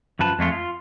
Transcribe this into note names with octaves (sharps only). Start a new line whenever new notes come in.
F#2 F3 B4 A5
F2 G#3 A3 F4
F4